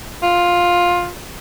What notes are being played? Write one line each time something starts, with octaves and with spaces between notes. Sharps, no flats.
F4